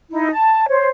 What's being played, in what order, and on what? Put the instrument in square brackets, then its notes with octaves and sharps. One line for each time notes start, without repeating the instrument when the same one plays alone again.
[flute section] D#4 E4
A5
C5 C#5